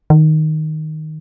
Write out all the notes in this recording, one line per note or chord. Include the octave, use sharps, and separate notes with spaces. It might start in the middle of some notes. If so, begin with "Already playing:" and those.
D#3